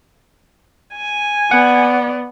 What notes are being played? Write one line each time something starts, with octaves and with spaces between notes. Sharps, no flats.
G#5
B3 D5 F#5